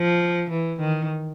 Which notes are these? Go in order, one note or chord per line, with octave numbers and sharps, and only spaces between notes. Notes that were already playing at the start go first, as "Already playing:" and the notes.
Already playing: F3
E3
D#3